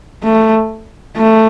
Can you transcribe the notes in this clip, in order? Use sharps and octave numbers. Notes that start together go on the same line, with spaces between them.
A3
A3